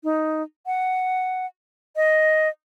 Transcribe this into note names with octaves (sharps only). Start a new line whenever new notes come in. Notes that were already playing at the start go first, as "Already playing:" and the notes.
D#4
F#5
D#5